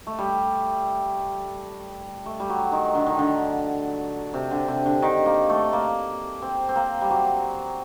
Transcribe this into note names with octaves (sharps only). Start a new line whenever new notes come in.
A3
G3
A3
G3
F#3
D#3
D3
D#3
D3
C3
D3
C3
D3
D#3
A#3
A3
A#3
C4
C4
A#3
G3
F#3